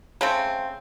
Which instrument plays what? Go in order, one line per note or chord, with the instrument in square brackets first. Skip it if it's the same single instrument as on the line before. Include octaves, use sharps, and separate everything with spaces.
[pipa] C#3 A3 C4